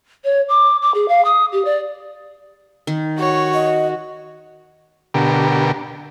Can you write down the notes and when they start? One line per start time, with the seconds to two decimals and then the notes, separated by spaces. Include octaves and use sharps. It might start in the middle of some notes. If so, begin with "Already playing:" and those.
0.24 C#5
0.49 D6
0.82 D6
0.94 G#4
1.08 F5
1.25 D#6
1.52 G4
1.65 D5
2.87 D#3
3.19 F#4 C#5
3.54 D#5
5.14 B2 D3 G4 A#4